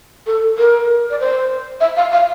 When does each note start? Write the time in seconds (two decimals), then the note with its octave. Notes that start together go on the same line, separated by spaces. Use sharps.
0.27 A4
0.58 A#4
1.10 D5
1.20 C5
1.80 E5
1.97 F5
2.12 F5